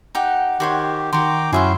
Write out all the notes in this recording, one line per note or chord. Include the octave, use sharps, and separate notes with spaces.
D#4 G4 F#5
D#3 F#4 G4 C5 C#5
D#3 F#4 G5 A#5 C6 D6
F#2 C#4 E4 F#4 G#4 E5 C6